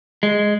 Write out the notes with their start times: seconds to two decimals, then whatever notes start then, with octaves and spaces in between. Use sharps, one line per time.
0.23 G#3